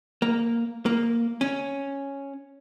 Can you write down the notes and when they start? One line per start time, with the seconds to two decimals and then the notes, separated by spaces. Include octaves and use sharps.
0.22 A#3
0.86 A#3
1.41 C#4